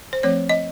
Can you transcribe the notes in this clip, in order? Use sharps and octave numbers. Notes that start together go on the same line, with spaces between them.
C5
F3 A3 C4 C#5
D#5